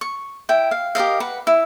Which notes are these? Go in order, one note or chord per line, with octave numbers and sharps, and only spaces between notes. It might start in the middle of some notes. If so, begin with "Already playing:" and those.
C#6
E4 G5
F5
G4 A#4 D#5 F5
B4 F#5
E4